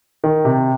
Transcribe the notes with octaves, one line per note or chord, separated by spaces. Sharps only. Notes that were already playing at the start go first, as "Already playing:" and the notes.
D#3
C3